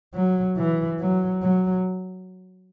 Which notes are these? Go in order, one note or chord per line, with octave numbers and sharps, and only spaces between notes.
F#3
E3
F#3
F#3